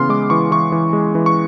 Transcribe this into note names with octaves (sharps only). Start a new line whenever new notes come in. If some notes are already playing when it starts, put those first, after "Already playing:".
Already playing: C#3 E3 B3 C6 F6
G#3 D6
E3 C#6
E3 C#6
E3
G#3
E3
C#6